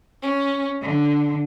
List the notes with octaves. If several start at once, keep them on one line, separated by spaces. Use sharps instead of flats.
C#4
D3